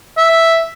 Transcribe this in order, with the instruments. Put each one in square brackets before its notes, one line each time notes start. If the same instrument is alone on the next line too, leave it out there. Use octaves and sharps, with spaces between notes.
[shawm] E5